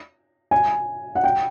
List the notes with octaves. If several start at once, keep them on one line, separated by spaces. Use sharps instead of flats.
G#5
F#5
G5